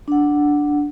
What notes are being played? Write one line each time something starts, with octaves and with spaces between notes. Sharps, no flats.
D4 F#5